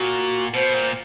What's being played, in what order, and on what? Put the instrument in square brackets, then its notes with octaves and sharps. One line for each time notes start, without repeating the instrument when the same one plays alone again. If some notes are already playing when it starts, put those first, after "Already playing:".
Already playing: [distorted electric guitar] A#2 [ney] F#4
[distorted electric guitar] B2 [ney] C5
[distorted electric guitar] A#2